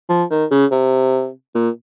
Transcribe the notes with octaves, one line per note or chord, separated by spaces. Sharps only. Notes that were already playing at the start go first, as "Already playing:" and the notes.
F3
D#3
C#3
C3
A#2